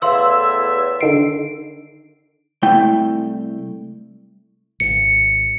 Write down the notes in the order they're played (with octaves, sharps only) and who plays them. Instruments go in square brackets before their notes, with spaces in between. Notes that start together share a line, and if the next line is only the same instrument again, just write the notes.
[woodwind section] E2 A2 E5 [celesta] F5 C6 E6
[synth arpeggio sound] D3 D#3 C7 [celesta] D7
[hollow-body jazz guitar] C2 A3 E4 G5
[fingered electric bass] G#1 [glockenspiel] C#7